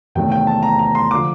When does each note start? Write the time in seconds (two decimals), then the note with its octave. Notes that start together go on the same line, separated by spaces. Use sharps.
0.15 E2 C3 D#3 F#3 A3 G5
0.32 G5
0.47 A5
0.63 A#5
0.79 A#5
0.95 C6
1.11 D3 F3 D6